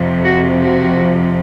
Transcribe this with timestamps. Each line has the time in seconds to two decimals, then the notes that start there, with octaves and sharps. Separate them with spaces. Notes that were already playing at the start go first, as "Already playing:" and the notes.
Already playing: F2 C3 F3
0.24 F#4
0.59 F#4